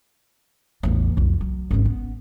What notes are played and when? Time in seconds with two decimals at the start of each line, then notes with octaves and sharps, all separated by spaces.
0.83 A1 E2
1.17 B1 F2
1.41 F#3
1.71 G#1 C#4
1.85 B3